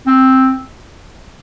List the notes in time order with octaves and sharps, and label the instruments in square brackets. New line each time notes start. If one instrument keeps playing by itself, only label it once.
[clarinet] C4